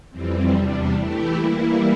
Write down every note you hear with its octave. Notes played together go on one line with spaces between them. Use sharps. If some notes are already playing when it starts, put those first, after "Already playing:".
F2 E3 G3 C4
E2 C3 G3 D4
E3 A3 E4 G4
E3 G3 A#3 E4